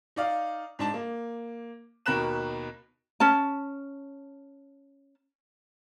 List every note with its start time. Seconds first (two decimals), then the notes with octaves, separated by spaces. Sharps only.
0.16 D#4 D5 F5
0.79 G#2 D4 A5
0.94 A#3
2.06 D#2 B2 A#4 B5 F#6 E7
3.20 C#4 A5